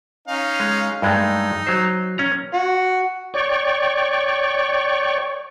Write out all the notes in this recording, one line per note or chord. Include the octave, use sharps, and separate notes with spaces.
C#4 D#4 F5
G#3
G2 G#3 A3 D#4
F#3 C5
C#4 A#5
F#4
C#5 D5 G5 C#6